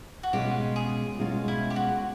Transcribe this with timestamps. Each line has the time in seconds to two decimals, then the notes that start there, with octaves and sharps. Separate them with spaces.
0.23 F#4
0.33 B2 G#3 C#4 F4 G4
0.76 G#4
1.19 B2 G#3 C#4 F4
1.48 E4
1.70 G4
1.76 F#4